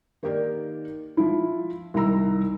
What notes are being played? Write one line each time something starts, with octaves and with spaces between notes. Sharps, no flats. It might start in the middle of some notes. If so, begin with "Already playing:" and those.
D#3 A#3 D#4 G4 A#4 D5
F3 E4
C2 D#3 A#5 E6